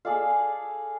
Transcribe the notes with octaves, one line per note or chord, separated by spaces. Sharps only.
G#4 A4 D5 F5